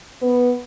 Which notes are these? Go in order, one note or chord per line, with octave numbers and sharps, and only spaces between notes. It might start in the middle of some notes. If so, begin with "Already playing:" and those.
B3